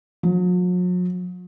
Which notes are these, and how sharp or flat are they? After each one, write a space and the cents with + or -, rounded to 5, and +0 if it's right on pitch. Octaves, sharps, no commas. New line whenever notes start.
F#3 -45